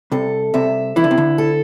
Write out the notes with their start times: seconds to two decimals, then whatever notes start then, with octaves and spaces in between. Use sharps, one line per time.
0.11 C2 C3 A4
0.54 C2 C3 E5
0.96 E3 E4
1.04 D3
1.11 C3
1.18 D2 D3
1.38 A4